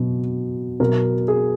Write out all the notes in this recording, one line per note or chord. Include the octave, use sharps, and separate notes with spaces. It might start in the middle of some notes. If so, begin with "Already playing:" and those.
Already playing: B2 F#3
B2 F#3 A#4
G#4